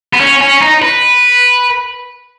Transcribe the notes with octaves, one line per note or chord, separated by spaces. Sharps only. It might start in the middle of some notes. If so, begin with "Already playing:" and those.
B3
C#4
C#4
D#4
B4